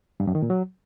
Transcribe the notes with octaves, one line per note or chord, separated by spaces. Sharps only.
G2
F#2
D#3
A#2
F#3